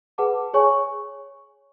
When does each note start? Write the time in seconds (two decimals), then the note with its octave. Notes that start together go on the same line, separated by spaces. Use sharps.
0.18 G#4 B4 F#5 A5 D6
0.54 G#4 C#5 G#5 C#6